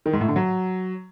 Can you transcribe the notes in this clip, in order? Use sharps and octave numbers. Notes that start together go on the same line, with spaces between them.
D#3
G#2
A2
D3
F#3